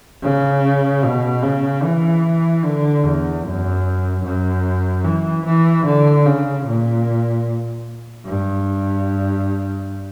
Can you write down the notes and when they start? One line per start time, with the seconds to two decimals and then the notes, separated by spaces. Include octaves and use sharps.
0.22 C#3
1.03 B2
1.42 C#3
1.84 E3
2.64 D3
3.04 E2
3.44 F#2
4.24 F#2
5.05 E3
5.45 E3
5.85 D3
6.25 C#3
6.65 A#2
8.25 G2